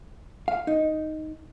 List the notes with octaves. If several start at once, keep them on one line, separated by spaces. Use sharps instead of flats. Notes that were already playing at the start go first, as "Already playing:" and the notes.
F5
D#4